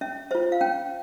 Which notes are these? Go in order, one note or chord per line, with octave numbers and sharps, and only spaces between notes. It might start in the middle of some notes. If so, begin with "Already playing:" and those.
C#4 E5
F4 C5 E5
F5
C#4 G5